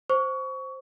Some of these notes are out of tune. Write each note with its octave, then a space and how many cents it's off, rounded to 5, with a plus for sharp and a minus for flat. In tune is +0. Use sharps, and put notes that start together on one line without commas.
C5 +0 C#6 +25